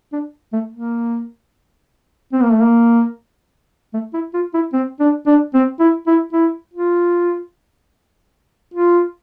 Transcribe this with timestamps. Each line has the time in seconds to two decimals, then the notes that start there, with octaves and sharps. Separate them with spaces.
0.13 D4
0.53 A3
0.73 A#3
2.33 C4
2.43 A#3
2.53 A3
2.62 A#3
3.94 A3
4.14 E4
4.34 F4
4.54 E4
4.73 C4
5.00 D4
5.27 D4
5.54 C4
5.80 E4
6.07 E4
6.33 E4
6.74 F4
8.74 F4